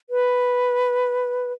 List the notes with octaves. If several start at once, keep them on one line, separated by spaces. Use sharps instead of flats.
B4